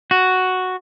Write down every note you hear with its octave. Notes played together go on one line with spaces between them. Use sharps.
F#4